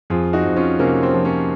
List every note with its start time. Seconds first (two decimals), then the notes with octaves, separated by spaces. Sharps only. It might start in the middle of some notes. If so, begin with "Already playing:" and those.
0.10 F2 F4 G#4
0.33 D#4 F#4
0.45 F2
0.56 C#4 F4
0.79 C3 A#3 C#4
1.03 C4
1.14 F3
1.25 A#3 C#4